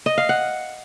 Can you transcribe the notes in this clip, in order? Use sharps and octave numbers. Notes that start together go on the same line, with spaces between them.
D#5
F5
F#5